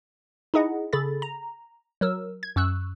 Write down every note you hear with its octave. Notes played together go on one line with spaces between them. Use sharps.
D#4 E4 G#4 D#5 F#5
C#3 G#4 A4 B5 A6
A#5
F#3 A#4 E6
G#6
F#2 C#6 E6 F#6